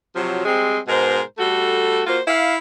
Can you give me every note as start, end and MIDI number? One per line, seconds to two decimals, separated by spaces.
0.16 0.44 48
0.16 0.44 53
0.16 0.44 54
0.45 0.78 55
0.45 0.78 56
0.45 0.78 60
0.88 1.20 44
0.88 1.20 47
0.88 1.20 70
0.88 1.20 72
1.38 2.01 55
1.38 2.01 57
1.38 2.01 66
1.38 2.01 69
2.06 2.19 58
2.06 2.19 65
2.06 2.19 66
2.06 2.19 72
2.28 2.57 64
2.28 2.57 77